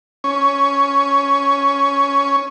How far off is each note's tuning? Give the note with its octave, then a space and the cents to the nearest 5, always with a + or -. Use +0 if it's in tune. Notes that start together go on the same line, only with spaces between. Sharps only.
C#4 +10